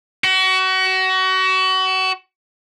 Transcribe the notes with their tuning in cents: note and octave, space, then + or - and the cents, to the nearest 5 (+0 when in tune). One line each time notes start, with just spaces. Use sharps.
F#4 +30